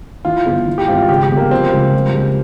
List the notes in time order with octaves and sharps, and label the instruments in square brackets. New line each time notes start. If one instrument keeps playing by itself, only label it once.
[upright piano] E3 [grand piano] F4
[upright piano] G1
E3
[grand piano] G4
[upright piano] G#1 [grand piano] F4
[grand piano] F4
[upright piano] C#3 [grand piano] G4
[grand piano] G4
[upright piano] G1
[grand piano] A#3
[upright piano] F3 [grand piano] C4
[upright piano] C#2
G3
C#2